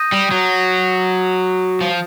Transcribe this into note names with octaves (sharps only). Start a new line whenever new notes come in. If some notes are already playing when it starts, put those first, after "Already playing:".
Already playing: D#6 G6 A#6 D#7
G3
F#3
F3